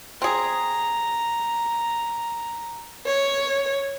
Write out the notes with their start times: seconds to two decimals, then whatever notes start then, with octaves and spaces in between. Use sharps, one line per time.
0.22 C4 G#4 A#5
3.04 C#5